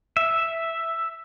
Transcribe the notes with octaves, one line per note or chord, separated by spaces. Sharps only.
E5